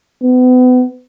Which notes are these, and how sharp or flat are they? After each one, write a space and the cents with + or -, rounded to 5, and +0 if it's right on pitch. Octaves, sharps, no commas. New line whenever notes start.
B3 +35